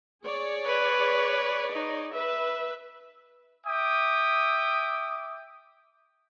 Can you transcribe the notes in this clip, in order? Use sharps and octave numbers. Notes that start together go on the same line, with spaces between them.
G#4 C#5 D5
B4
D#4
B4 E5
E5 G5 D6 D#6